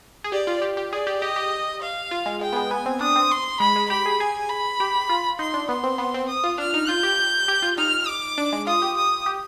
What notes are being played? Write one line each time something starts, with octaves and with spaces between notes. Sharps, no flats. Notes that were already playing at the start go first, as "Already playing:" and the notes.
G#4
G4 D5
F4
G4
G4
G#4 D5
G4
G4 D#5
G4
F5
F4
G#3
G#3 G5
B3
G#3
B3 G#5
C4
D4 D#6
C4
C6
G#3 B5
G#3
G4 B5
G#4
G#4 G#5
B5
G4
F4
D#4 C6
D4
B3 C6
C4
B3
C4
D#6
F4
D4 F6
D#4
F4 G6
G4
G4
F4
D#4 F6
D6
D4
G#3
F4 D#6
G4
D#6
G4